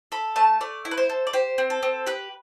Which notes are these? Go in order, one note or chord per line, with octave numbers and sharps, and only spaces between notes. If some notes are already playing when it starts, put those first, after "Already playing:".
A4 B5
A3 A5
A3 D5
E4
B4
C5
A4
D5
G4 C5
C4
A4
C4
G4 B4